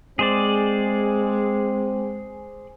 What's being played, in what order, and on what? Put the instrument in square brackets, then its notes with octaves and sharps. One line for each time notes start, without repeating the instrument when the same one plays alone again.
[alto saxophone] G#3 [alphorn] C4 [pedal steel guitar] G#4 C5 D5